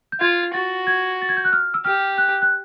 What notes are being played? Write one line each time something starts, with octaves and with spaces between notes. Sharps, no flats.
G6
F4 G#6
F#4 A6
G#6
A6
G#6
G6
F#6
F6
E6
G4 F6
F#6
F#6